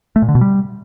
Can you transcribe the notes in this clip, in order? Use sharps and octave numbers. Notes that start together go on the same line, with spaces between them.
A3
A#2
D3
B2
G3